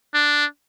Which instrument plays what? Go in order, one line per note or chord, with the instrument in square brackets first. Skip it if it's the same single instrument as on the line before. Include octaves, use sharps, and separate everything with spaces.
[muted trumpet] D4